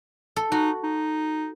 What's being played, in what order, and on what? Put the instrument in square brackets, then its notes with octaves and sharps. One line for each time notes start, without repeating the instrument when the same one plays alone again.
[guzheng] A4
[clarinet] D#4 [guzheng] F#4
[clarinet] D#4